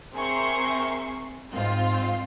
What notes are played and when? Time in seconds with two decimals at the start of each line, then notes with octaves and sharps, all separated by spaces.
0.13 C4 G#4 A#4 E5 C6 C#6
1.52 G#2 C4 F4